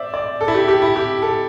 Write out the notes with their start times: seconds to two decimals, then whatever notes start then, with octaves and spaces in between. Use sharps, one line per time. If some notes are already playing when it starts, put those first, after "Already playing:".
Already playing: C5 D5 E5
0.14 D5
0.41 A4
0.48 E4
0.55 G4
0.68 G4
0.82 E4
0.96 G4
1.22 A4